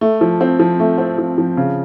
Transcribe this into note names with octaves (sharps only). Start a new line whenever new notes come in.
A3
F3
C4
F3
A3
C4
F3
F3
C#3